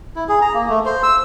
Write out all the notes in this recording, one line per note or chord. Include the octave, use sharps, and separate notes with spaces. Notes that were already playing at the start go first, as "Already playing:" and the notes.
E4
G#4
A#5
A#3
A3
C5
E6